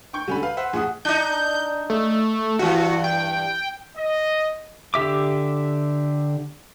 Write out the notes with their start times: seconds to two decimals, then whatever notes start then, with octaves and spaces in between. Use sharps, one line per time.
0.13 G5 C#6 G6
0.28 D3 G3 C#4 A4 B5
0.43 B4 F5
0.57 C5 E5 F#5
0.73 A#1 G#4 F#5 D#6
1.05 D4 D#4 G6
1.90 A3
2.59 G2 E3 F#4
3.04 G5
3.97 D#5
4.94 D3 G4 E5 D6